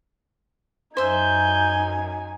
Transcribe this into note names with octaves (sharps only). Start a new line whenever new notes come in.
F#2 D#4 C5 E5 G#5 G6